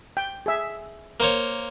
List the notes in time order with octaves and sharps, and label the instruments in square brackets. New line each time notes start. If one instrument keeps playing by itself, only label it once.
[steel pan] G5
G#4 E5
[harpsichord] A#3 C5 C#5